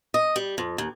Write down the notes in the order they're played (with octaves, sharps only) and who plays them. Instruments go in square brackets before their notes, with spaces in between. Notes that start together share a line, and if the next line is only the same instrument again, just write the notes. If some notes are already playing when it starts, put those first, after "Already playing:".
[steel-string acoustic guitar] D#5
G3
F2
D#2